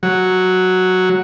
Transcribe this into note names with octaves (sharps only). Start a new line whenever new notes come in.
F#3